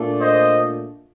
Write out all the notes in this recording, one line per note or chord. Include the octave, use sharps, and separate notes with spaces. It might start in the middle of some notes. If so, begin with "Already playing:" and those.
Already playing: A#2 A3 D4 F4
C5 D#5